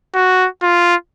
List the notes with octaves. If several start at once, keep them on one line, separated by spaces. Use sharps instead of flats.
F#4
F4